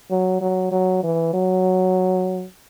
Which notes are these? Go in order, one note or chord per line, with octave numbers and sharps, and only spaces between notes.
F#3
F#3
F#3
E3
F#3